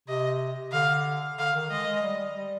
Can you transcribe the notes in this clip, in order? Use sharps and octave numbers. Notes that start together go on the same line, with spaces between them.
C3 D#5
D3 F5
D3 F5
D#3
G#3 D#5
G#3
G3
G3